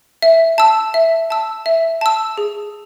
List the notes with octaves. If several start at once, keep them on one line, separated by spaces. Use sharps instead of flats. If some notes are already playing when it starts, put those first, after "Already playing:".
E5
A5 E6
E5
A5 E6
E5
A5 E6
G#4